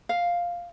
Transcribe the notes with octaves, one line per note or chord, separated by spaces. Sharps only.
F5